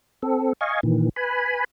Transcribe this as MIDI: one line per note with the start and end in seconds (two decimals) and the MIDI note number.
0.23 0.53 60
0.23 0.53 69
0.61 0.80 75
0.61 0.80 77
0.61 0.80 80
0.61 0.80 85
0.83 1.09 46
0.83 1.09 51
0.83 1.09 52
1.16 1.64 71
1.16 1.64 80
1.16 1.64 83